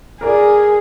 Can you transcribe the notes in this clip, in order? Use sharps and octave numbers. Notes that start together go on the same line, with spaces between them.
G#4 A#4 D5